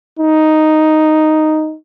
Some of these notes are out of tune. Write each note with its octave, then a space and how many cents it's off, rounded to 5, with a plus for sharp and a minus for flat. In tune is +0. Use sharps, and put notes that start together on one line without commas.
D#4 +0